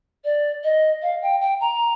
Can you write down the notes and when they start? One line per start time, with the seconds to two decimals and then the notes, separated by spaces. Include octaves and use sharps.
0.24 D5
0.63 D#5
1.02 F5
1.22 G5
1.40 G5
1.60 A#5